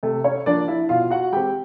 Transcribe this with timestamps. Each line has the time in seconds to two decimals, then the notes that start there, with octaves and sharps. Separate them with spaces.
0.03 C3 A3 A4
0.24 C#4 C#5
0.46 F3 A#3 D4 D5
0.68 E4 E5
0.89 B2 F4 F5
1.10 F#4 F#5
1.32 G#3 C4 G4 G5